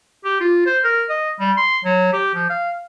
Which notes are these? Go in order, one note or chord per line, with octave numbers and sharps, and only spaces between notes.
G4
F4
C5
A#4
D#5
G3
C6
F#3
G4
F3
F5